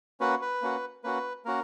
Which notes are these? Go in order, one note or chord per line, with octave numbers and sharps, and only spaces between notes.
A#3 C#4 F#4 B4
B4
A#3 C#4 F#4
A#3 C#4 F#4 B4
A#3 C#4 F#4 A#4